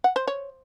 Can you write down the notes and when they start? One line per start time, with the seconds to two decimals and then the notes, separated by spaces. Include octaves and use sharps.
0.04 F#5
0.16 C5
0.27 C#5